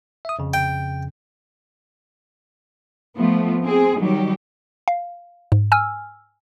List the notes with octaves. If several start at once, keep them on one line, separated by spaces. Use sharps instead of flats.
E5 D#6
F2 C#3
G5
F3 A3 B3
C4 G#4
D#3 F#3 G3 G4
F5
G#2
G#5 E6 F6